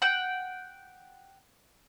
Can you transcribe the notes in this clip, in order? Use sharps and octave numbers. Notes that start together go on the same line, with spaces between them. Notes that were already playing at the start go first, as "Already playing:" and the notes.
F#5 G5